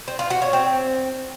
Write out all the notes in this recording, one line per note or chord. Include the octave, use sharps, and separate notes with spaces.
C4
F4
F#4
C#5
C4